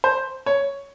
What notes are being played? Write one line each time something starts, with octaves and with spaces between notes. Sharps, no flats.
C5
C#5